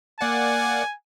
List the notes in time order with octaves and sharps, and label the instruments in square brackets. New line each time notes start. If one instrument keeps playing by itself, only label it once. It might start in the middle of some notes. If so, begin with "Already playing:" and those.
[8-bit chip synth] A#3 D5 F#5 [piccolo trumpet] G#5